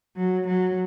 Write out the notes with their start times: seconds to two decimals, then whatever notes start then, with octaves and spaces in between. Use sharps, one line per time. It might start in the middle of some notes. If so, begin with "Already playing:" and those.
0.16 F#3
0.47 F#3